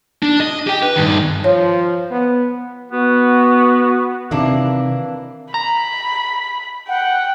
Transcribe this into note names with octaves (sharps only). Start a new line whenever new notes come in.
D4
D#5
G4 G5
B4
G2 D#3
F3 C#5
B3
B3 F#4
C3 D#3 E3 A#3 D4
A#5 B5
F#5 G5